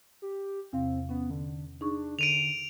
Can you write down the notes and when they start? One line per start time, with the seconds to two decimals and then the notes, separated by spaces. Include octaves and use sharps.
0.22 G4
0.73 E2 C3 C4 F5
1.09 B3 C#4
1.30 D3
1.81 D4 D#4 G#4 C#6
2.19 D3 D7 D#7 F7